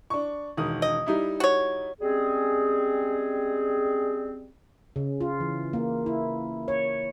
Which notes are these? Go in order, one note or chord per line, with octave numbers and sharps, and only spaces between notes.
D4 C#6
E1 D#3 D#6
D#5
G3 D#4 E4
F#4 C#5
G3 G#3 C4 C#4 G#4
C#3
F4
E3
A#3
E4
C#5